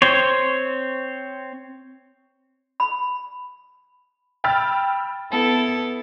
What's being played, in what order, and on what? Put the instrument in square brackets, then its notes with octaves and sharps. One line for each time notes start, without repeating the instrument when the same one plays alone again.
[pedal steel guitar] C4 C5 C#5
[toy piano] B5
[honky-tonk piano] G5 B5 E6 F6 A6
[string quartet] B3 E4 A4